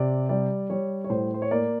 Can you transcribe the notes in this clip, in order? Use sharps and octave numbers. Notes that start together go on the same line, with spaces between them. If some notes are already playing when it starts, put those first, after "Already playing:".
Already playing: C3 D5
G3 D5
G3 C#5
C#5
A2 C5
C5
C#5
A#3 D5